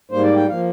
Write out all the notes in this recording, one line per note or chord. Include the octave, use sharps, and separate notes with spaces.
G#2 G3 A#3 C5
D5
G5
F3 A#3 F5